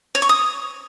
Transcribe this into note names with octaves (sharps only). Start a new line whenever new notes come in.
C#5
C#6
D#6